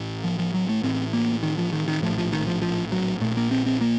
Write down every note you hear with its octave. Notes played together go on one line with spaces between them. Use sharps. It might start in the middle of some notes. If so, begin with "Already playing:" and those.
Already playing: A1 A2
F3
F3
F#3
A3
A1 A2 C4
A#3
D#3
F3
D#3
D#3
A#1 A2 F3
F3
D#3
F3
F3
F#3
A#1 A#2 A3
A#3
C4
C4
A#3